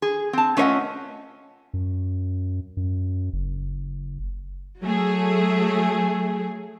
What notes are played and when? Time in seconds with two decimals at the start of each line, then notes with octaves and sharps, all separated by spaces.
0.02 G#4
0.33 C4 A5
0.57 A3 C#4 F4 C#5 D#5 F#5
1.74 F#2
2.77 F#2
3.33 F#1
4.82 F#3 A3 G#4